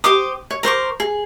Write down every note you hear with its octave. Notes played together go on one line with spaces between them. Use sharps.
G4 C5 D6 D#6
C#5
A#4 C5 C#6 D6
G#4